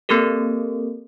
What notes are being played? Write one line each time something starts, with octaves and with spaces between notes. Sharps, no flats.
A#3 C4 G4 A4 A#4